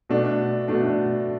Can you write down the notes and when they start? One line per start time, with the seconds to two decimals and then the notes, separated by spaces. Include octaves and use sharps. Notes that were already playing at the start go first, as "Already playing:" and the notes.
0.09 B2 A3 D4
0.68 B2 A3 D4